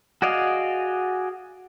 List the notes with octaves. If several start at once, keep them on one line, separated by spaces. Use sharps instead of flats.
F#4 G#4 D5 D#5 F5